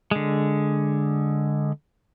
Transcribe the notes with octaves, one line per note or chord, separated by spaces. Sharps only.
D3 G#3